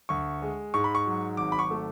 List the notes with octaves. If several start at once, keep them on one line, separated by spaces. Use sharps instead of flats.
D2 C#6
G#3
G#2 C#6
B5
C#6
F#3
G#1 D6
B5
C#6
A3